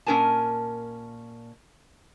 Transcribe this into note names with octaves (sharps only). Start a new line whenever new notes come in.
A#2 C#4 A#4 G#5 A5